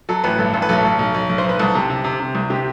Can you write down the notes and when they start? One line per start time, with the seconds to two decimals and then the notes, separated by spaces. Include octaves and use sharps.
0.09 F#3 A4
0.24 A1 B4
0.39 G2 A4
0.53 A1 A4
0.62 B4
0.69 B1 A4
0.85 B1
0.99 B1
1.14 B1
1.29 B1
1.38 C5
1.44 B1
1.49 B4
1.59 C2 A4
1.75 C3
1.90 C3
2.04 C3
2.20 C3
2.35 C2
2.50 C3 G4